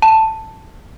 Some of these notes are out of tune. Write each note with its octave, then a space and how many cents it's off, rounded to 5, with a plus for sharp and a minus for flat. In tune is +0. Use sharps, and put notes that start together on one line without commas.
A5 +5